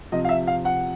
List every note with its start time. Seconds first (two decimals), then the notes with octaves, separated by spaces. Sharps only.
0.12 C3 F3 D#5
0.25 F5
0.29 E5
0.47 F5
0.65 F#5